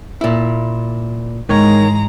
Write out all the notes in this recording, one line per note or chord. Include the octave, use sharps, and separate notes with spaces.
A#2 E4
G#2 D#3 E3 G#3 C#5 A#5